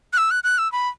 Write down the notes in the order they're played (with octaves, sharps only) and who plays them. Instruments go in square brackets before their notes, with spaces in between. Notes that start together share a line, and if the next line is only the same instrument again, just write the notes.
[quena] F#6
E6
F#6
F#6
E6
B5